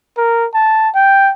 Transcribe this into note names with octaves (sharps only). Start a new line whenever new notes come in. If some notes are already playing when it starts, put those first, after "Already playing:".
A#4
A5
G5